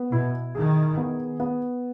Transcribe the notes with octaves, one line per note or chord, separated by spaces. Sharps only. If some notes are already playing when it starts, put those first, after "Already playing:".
Already playing: B3
B2 E4
D#3 G#4
B3
B3